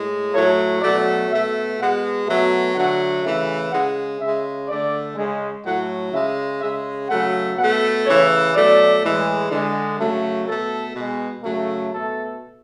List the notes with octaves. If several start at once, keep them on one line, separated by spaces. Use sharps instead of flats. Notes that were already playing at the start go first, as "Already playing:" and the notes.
Already playing: A2 G#3
A2 F#3 A3 C#5
B2 F#3 A3 D5
B2 A3 E5
B2 G#3 F#5
B2 F#3 A3 E5
D3 F#3 A3 F#5
C#3 E3 A3 E5
C#3 G#3 F#5
C#3 G#3 E5
D3 A3 D5
C#3 G#3
A2 F#3 A3 F#5
C#3 G#3 E5
C#3 G#3 E5
C#3 F#3 A3 F#5
B2 A3 F#5
C#3 E3 A3 C#5
B2 F#3 A3 D5
A2 E3 G#3
D3 G#3
C#3 F#3 A3
B2 A3 A4
B2 G#3
C#3 F#3 A3
B2 A3 A4